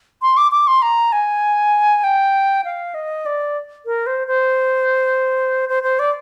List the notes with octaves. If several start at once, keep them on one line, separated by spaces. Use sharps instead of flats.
C6
D6
D6
C6
A#5
G#5
G5
F5
D#5
D5
A#4
C5
C5
C5
C5
D5